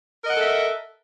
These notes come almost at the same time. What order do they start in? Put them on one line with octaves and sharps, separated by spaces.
A#4 D#5 F#5 A4 E5